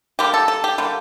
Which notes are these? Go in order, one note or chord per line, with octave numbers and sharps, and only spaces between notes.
D3 G3 A#3 G4
A4
A4
G4
D3 G3 A#3